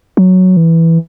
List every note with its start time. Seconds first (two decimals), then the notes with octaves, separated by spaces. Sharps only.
0.17 F#3
0.57 E3